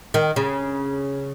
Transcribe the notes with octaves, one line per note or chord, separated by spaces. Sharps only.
D#3
C#3